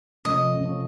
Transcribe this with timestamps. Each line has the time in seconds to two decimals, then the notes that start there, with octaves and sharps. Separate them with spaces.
0.25 C3 F3 A3 C#4 D#5
0.63 C3 F3 A3 C#4